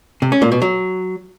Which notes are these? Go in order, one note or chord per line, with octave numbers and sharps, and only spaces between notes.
C3
C#4
A#2
B2
F#3